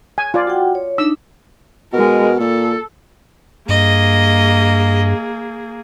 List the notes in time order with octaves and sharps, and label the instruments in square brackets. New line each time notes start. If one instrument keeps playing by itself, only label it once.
[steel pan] G#5
F4 D5
[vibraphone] F#4 F#5 G5
C#5
[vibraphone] D4 D#4 [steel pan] E6
[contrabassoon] B2 [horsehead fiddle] G#3 A#4
[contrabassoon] A#2 [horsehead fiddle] A4
[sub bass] G2 [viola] A#3 G#4 [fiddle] D#5